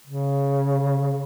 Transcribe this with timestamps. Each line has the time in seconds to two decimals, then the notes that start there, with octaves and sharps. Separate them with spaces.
0.07 C#3